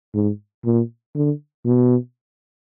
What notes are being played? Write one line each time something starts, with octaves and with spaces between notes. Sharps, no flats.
G#2
A#2
D3
B2